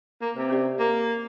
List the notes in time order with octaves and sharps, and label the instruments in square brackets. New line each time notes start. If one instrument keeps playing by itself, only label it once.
[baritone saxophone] A#3
[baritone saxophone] C3 [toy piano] B4
[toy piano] C#4 G4 D5
[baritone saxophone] A#3